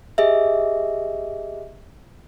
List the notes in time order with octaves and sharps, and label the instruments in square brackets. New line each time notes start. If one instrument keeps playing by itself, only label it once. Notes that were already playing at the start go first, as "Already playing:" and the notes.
[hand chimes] G4 G#4 D#5 E5